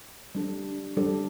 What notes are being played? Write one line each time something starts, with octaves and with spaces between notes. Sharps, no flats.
G3 D4 A4
G3 D4 A4